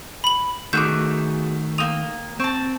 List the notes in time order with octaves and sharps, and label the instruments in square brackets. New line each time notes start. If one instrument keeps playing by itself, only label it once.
[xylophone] B5 F#7
[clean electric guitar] D#3 A3 [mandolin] F#4 G#4 D6 [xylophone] G6
[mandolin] A#3 G5 D#6 [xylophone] F7
[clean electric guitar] C4 [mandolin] A5 C#6